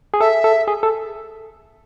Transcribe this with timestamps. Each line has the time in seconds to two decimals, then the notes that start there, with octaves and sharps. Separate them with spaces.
0.14 G#4
0.21 A4 E5
0.44 A4
0.67 G#4
0.83 A4